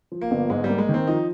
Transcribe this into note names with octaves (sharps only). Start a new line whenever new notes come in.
F3
A#3
G1
G#2 G#3
G3
A#3
G#3
D#3 C4
F3 D#4